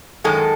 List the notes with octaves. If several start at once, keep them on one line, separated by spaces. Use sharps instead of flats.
F#2 D#3 G#3 A4